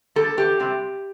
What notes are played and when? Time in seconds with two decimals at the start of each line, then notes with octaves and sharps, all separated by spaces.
0.16 G3 A#3 A4
0.37 E2 G4
0.60 C3 G3 C4